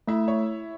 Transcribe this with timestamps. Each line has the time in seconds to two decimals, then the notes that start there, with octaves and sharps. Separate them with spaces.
0.07 A3 E4 E5
0.28 C#5